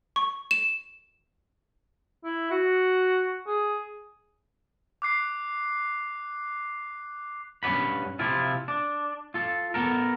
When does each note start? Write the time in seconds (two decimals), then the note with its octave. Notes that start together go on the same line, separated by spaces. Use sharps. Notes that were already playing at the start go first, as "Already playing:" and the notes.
0.16 C#6
0.51 E7
2.24 E4
2.51 F#4
3.47 G#4
5.02 D6 F#6 C7
7.63 G2 C#4 D5 F#5 B5
8.19 C3 F3 C4 E4 F4
8.68 D4
9.34 F4 A4
9.74 B3 A4 A#4